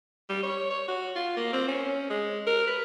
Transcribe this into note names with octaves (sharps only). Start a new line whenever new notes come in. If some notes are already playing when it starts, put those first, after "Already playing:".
G3
C#5
C#5
F#4
F4
A#3
C4
C#4
G#3
A#4
B4